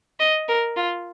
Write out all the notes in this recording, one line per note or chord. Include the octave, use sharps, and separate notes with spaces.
D#5
A#4
F4